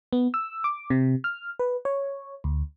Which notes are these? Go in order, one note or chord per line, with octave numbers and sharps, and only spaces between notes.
B3
E6
D6
C3
F6
B4
C#5
D2